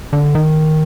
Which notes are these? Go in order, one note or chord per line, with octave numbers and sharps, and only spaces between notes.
D3
D#3